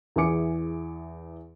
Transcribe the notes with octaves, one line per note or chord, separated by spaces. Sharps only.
E2 E3 G#4 G#5 D6 C#7